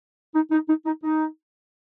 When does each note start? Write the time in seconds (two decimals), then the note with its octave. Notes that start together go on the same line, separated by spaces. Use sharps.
0.33 D#4
0.50 D#4
0.67 D#4
0.85 D#4
1.03 D#4